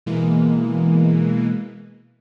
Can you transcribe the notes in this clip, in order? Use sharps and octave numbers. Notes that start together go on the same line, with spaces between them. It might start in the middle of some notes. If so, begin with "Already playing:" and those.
B2 E3 G#3 A#3